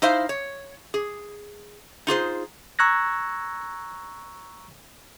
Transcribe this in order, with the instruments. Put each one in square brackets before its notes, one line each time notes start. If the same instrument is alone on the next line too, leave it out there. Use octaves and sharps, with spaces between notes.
[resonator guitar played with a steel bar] D#4 E4 C5 F5
C#5
G#4
D#4 F4 G#4 C5
[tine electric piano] A#5 C#6 E6 F#6 G#6 A#6